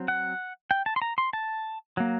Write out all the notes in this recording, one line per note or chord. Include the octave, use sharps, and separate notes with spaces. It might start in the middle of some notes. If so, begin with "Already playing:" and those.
Already playing: F#3 C4
F#5
G5
A5
C6
A#5
C6
A5
F#3 A#3